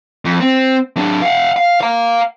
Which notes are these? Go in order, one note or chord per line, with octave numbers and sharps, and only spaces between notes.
F2
C4
F#3 D4
F5 F#5
F5
F5 A#5